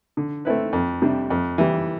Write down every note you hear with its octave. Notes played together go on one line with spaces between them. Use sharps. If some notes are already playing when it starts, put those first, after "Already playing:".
D3
A3 C4 E4 B4
F2
C3 G3 D4
F2
E3 G3